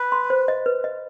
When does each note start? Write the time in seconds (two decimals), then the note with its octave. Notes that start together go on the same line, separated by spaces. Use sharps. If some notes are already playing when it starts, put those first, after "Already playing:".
Already playing: B4
0.12 C6
0.30 C5
0.48 D#5
0.66 B4
0.84 D#5